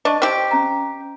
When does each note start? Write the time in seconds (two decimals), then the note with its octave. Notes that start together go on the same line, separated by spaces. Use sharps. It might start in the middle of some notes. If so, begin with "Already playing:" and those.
0.05 D4 D#5 A5 C#6
0.22 C4 G4
0.51 C#4 A#5